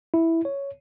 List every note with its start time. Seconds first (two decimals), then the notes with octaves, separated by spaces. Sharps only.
0.14 E4
0.45 C#5